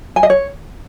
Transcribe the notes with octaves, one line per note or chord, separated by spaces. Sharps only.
G#5
D#5
C#5